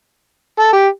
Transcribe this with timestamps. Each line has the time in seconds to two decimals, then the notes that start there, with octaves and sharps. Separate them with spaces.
0.59 A4
0.73 G4